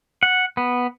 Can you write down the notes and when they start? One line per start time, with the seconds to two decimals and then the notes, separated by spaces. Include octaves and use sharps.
0.23 F#5
0.57 B3